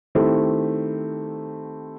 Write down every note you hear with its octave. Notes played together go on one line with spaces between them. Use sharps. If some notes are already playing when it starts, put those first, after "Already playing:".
D#3 A3 C4 E4 G4